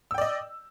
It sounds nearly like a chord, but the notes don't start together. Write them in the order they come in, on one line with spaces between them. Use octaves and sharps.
E6 G5 D5 D#5